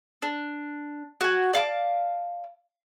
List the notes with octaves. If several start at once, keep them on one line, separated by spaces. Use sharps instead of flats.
D4
F#4 G#5
D5 F5 A5 D6